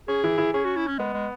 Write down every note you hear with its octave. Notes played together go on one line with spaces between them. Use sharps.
C#4 G#4
E3 E4
E3 E4
C#4 G#4
F#4
E4
C#4
G#3 B3
G#3